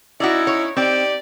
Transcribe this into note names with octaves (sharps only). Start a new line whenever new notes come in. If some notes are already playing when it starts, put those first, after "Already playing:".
C#4 D#4 E4 F#4 D5
C#5
C4 D#4 G4 D5